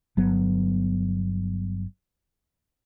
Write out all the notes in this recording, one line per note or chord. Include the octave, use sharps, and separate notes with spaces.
G1 F#3 B3